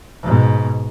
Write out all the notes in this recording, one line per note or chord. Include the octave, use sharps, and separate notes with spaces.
G#2 B2